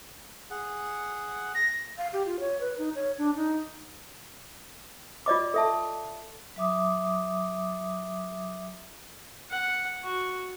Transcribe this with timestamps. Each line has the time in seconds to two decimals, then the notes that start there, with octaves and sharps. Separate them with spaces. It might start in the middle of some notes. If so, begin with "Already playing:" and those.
0.51 G#4 F#5
1.54 A#6
1.98 F5
2.13 G4
2.26 F4
2.40 C#5
2.61 B4
2.79 D#4
2.95 C#5
3.18 D4
3.35 D#4
5.26 F4 D5 D#5 D6
5.54 A4 E5 A5
6.56 F#3 E5 D6 D#6
9.50 F#5
10.03 F#4